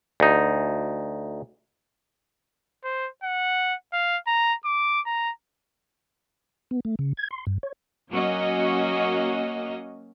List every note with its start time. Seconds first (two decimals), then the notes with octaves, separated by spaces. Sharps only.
0.20 D2 D#4
2.84 C5
3.23 F#5
3.93 F5
4.27 A#5
4.65 D6
5.06 A#5
6.71 B3
6.85 A3
6.99 C#3
7.17 G#6
7.31 C6
7.47 G2
7.63 C#5
8.11 F#3 A#3 C#4 F#4 D#5